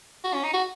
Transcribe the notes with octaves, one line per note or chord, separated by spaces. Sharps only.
F#4
C#4
D#4
F#4